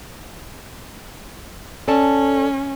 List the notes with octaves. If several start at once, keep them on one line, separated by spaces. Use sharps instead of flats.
C#4 A4 D5 A5